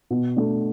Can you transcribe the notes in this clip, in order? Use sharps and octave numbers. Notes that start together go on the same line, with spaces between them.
B2
A3 D4